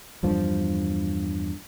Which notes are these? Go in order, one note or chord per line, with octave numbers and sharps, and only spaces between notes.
E2 G2 F3